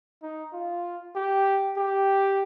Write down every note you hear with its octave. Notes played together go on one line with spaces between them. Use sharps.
D#4
F4
G4
G4